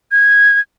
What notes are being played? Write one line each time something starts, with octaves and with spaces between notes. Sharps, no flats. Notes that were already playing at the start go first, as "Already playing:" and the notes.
G#6